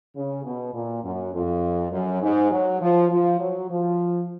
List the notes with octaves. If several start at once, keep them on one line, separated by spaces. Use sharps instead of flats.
C#3
B2
A#2
F#2
F2
F#2
G#2
F#3
F3
F3
F#3
F3